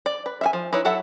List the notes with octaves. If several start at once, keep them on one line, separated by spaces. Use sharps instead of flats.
D5
B4
E5 F5 G#5
F3
D#4 E4 B4 C#5
F#3 E4 A4 E5 F#5